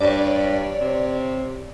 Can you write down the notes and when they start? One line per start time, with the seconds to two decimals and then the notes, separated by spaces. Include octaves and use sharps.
0.01 G2 C#5 D5
0.80 C3